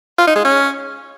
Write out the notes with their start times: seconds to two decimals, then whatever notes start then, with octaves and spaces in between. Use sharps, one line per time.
0.18 F4
0.27 D#4
0.36 G#3
0.45 C#4